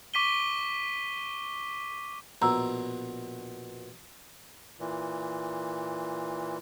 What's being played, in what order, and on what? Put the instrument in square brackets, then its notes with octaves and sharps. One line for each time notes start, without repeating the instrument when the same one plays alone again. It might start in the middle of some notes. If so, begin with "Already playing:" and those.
[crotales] C#6 D6 B6 D#7 G7
[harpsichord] A#1 B2 [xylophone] A#5 E6
[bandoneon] A#2 E3